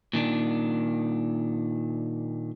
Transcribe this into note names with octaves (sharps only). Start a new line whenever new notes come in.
A#2 D#3 D4